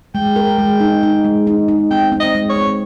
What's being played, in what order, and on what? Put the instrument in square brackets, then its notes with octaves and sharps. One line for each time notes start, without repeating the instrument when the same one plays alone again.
[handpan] G#3 [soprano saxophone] G5
[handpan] A#4
G#3
D#4
D#4
G#3
D#4
D#4
[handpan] C4 [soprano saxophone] G5
[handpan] C4
[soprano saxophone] D#5
[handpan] G#3
[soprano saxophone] C#5
[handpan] C4